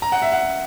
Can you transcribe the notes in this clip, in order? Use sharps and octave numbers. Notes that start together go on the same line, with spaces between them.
A#5
F#5
E5
F#5